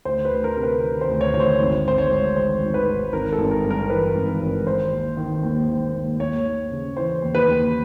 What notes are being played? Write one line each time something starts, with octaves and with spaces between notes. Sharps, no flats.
D2 C5
B4
D2
A#4
C3
B4
D#3
C5
D2
C#5
D2 C#5
C5
G#1
G#1 C5
C#5
G#2
D#3 C5
G#1
B4
G#1
G#1 A#4
A4
G#1
A#4
G2
A#4
E3 B4
G#1
A#4
G#1
D#3 C5
D#2
D#3
D#2
D#3
D#2
D#2 C#5
D#2
C#3
E3 C5
D#2
B4
D#2